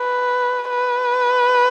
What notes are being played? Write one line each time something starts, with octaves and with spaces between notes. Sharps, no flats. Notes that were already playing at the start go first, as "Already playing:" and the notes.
Already playing: B4
B4